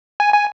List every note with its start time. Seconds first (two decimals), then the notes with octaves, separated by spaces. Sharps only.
0.20 G#5
0.34 G#5